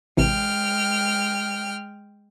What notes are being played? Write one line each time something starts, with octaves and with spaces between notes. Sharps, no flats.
A1 C3 E3 G#3 G5 F6